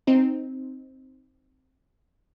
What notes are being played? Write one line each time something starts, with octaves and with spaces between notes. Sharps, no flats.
C4 D#4